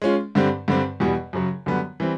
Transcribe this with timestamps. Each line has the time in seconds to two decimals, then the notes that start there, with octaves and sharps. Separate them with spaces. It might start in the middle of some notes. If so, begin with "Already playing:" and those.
0.02 G#3 C#4 F4
0.35 G2 D3 G3 C4
0.68 G2 D3 G3 C4
1.00 E2 B2 G3
1.33 F#2 C#3 F#3
1.66 F#2 D3 G3 B3
2.00 E3 G3 C4